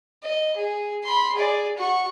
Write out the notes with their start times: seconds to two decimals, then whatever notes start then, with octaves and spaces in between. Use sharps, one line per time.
0.23 D#5
0.56 G#4
1.04 B5 C6
1.35 G#4 D5
1.77 F#4 C#6